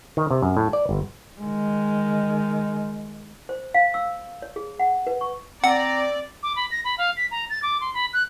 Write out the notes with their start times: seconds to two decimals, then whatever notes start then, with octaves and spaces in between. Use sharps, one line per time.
0.17 D#3
0.31 C3
0.42 F#2
0.57 A2
0.73 D5
0.89 G1
1.40 D#3 G#3
3.49 C5
3.74 F5
3.94 E6
4.42 C#5
4.56 G#4
4.79 F#5
5.07 B4
5.21 C#6
5.64 C4 D5 F#5 A#5
6.43 D6
6.56 B5
6.71 A#6
6.85 B5
6.98 F5
7.17 B6
7.31 A#5
7.50 A6
7.63 D6
7.81 C6
7.94 B5
8.13 F#6